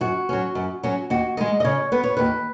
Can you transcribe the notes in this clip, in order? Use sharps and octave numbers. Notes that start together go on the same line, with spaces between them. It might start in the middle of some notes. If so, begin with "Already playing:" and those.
F#2 F#4
F#3 C#4
F#2
F#3 C#4
D#2 F#4
D#3 G#3 D#5
D#5
C#3 C#5
B3 B4
C#5
D#2 B4